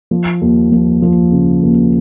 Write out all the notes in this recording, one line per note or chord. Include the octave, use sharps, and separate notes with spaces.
F3
D#2
F3
F3
C#3
D#2